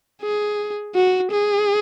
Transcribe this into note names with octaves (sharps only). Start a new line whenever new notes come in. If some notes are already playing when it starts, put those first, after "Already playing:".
G#4
F#4
G#4